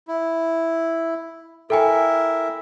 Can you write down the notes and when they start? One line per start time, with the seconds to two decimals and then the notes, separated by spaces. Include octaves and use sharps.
0.08 E4
1.70 E4 A4 A#4 E5 G5 G#5